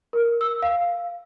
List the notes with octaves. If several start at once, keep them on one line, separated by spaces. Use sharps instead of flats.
A#4
E6
F5